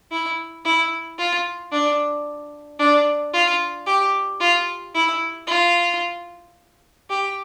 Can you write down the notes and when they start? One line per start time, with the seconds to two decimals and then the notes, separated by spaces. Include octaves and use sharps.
0.11 E4
0.65 E4
1.19 F4
1.72 D4
2.79 D4
3.34 F4
3.86 G4
4.40 F4
4.94 E4
5.47 F4
7.10 G4